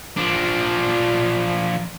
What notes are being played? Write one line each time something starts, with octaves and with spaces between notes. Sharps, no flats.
F3 D4